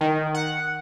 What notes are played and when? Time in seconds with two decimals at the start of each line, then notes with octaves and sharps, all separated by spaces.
0.01 D#3
0.34 F#5